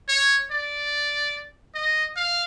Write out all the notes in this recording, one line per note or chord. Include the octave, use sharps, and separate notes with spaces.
C#5
D5
D#5
F5